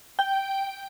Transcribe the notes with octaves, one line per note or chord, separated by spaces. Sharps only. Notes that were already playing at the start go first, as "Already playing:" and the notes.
G5